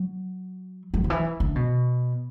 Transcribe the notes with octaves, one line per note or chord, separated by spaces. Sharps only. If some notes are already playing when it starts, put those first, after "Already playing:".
Already playing: F#3
F#3
D3
E3
D3
B2